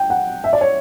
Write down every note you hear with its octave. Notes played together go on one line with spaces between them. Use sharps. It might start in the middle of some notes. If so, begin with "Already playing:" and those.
Already playing: G5
F#5
E5
D5
C#5